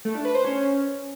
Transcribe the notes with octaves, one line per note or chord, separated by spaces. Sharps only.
A3
D4
B4
C5
C#4